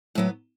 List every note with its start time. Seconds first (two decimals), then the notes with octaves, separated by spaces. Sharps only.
0.15 A2 F#3 B3